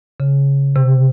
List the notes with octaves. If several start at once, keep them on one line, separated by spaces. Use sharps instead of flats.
C#3
C3